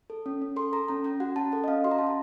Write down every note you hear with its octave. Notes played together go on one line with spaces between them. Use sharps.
A4
C#4
C#4
A4 C6
A4 A#5
C#4 A#5
C#4 A#5
F#4 F#5
C#4 A5
A4 F#5
D#5
C#4 F5
F#4 C6
A#5
C#4 A5
A#5